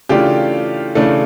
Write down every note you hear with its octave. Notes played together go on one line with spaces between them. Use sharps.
C#3 E3 A3 D4 F4 G4
C#3 E3 A3 D4